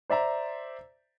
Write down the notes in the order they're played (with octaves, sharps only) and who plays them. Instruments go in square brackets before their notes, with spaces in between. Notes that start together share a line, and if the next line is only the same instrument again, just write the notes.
[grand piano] C5 D5 E5 A#5